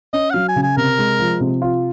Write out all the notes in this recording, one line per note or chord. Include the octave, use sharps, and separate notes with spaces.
C#4 D#5
F#5
F#3 F5
G#5
C#3
G#5
C3 A#4
G#3
F3
C3
F4